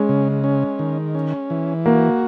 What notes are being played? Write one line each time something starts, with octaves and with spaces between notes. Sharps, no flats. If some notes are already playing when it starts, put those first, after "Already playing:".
Already playing: G#3 C#4
C#3
C#4
D#3
C#4
E3
A#3 F#4